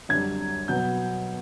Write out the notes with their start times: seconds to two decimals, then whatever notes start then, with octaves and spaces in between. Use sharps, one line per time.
0.09 F#2 D3 G3 G#6
0.68 B2 F#3 B3 G6